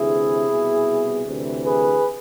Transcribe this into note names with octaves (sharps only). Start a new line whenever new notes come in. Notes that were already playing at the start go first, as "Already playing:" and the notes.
Already playing: D2 C3 E3 E4 G#4
C2 B2
D2 C3 E3
G#4 B4